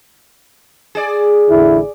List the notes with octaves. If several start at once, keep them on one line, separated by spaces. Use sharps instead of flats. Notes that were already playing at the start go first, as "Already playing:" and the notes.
G#4 D5
A1 D3 E4